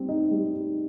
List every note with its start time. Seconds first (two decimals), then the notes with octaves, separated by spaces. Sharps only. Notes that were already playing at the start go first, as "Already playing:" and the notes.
Already playing: G3 C4
0.09 D#4
0.31 G3
0.54 D#4